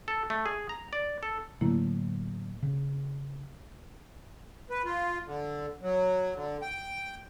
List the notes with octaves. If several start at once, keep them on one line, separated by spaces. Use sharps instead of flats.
A4
A3
G#4
A#5
D5
A4
A2 D3 F#3 A3 A#3 E4
C#3
B4
F4
D3
F#3
D3
G5